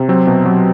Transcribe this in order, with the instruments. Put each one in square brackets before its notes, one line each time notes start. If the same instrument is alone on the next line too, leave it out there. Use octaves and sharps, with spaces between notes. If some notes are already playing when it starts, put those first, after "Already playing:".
Already playing: [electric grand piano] C3
F#3 C4
B2
F#3